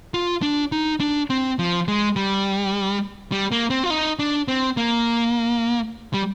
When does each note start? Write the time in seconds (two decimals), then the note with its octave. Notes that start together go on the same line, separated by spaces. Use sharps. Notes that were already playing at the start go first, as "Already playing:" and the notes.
0.14 F4
0.42 D4
0.72 D#4
1.00 D4
1.30 C4
1.59 F3
1.88 G#3
2.16 G3
3.32 G3
3.52 A#3
3.70 C4
3.84 F4
3.90 D#4
4.19 D4
4.48 C4
4.77 A#3
6.14 G3